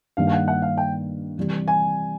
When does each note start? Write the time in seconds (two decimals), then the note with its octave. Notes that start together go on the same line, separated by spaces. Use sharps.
0.17 G2 D#3 G3 A#3 F5
0.27 F5
0.32 F#5
0.48 F#5
0.62 F5
0.78 G5
1.38 C3 E3 G3
1.68 G#5